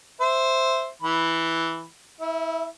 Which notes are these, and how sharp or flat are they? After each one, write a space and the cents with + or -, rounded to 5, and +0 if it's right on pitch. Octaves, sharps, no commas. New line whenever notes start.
C5 +0 E5 +0
E3 +0 B5 +0
E4 -25 E5 +15